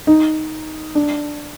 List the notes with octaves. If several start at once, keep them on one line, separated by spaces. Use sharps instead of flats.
D#4
D4